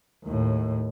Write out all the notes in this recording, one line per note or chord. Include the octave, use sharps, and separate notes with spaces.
D#2 A2